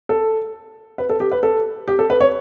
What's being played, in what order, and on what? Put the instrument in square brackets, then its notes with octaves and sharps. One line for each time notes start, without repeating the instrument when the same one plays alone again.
[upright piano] A4
B4
A4
G4
B4
A4
G4
A4
B4
C#5